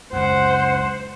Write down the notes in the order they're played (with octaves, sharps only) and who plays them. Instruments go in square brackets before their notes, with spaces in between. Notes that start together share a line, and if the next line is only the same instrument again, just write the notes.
[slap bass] C#2 F#2 [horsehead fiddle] C5 [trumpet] F#5